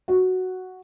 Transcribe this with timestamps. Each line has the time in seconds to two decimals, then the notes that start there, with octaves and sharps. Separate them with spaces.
0.08 F#4